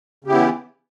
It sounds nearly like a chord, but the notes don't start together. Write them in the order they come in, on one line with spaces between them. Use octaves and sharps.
C#3 G4 E4 B3 E3